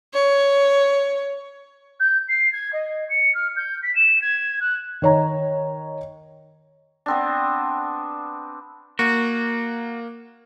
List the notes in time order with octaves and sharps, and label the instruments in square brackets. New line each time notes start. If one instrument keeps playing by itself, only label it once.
[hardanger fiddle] C#5
[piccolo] G6
C7
G#6
D#5
C#7
F6
G6
B6
E7
G#6
F#6
[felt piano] D#3 C#5 A#5
[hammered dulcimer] B3 C4 D4
[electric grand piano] A#3 [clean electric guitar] F#4